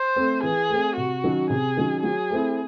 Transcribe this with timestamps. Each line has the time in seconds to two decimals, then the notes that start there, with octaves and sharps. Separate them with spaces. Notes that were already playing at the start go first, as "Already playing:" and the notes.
Already playing: C5
0.16 A3 C4
0.43 E3 G#4
0.70 A3 C4
0.97 C3 F#4
1.24 D#3 F#3 C#4
1.50 C3 G#4
1.77 D#3 F#3 C#4
2.03 F#3 G#4
2.31 A3 C4 E4